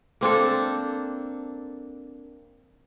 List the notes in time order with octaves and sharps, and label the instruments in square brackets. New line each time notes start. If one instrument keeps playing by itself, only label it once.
[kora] A#3 C4 D4 A4